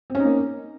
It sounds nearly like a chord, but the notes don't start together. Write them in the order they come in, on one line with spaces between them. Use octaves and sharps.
C4 C#4 D#4 A#3